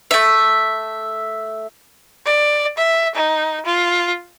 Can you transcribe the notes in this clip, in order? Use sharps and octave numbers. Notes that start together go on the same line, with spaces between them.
A3 E5
D5
E5
D#4
F4